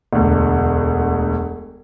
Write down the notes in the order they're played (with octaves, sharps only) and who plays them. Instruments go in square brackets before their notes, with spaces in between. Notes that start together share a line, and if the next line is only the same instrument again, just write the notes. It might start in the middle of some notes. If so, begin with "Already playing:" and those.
[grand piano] E1 D2